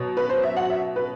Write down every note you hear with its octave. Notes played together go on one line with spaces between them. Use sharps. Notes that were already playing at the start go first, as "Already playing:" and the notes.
Already playing: B2 F#3
B4
C5
E5
F#5
E5
B4